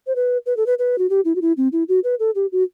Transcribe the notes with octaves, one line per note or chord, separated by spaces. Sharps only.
C5
B4
B4
A4
B4
B4
F#4
G4
E4
F#4
E4
C4
E4
F#4
B4
A4
G4
F#4